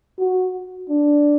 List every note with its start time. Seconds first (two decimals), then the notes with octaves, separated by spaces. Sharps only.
0.18 F#4
0.89 D4